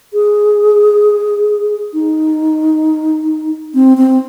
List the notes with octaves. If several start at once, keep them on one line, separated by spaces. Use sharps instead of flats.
G#4
D#4
C4
C4